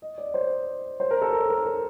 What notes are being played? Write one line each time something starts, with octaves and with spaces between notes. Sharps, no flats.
D#5
D5
C5
C5
A#4
A4
A#4
A#4
A#4